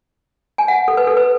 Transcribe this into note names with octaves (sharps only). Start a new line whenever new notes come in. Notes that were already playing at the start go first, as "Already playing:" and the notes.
G#5
F#5
A4
B4
A4
B4